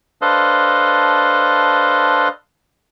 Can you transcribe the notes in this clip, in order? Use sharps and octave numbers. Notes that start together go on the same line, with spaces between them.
D4 A4 B4 C5 D#5 F5